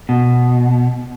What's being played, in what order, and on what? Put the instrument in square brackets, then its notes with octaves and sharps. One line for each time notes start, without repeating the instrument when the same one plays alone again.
[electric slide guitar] B2